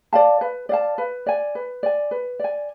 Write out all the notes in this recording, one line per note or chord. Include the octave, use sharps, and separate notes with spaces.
D5 F5 A5
B4
D5 F5 A5
B4
D5 G#5
B4
D5 G#5
B4
D5 G#5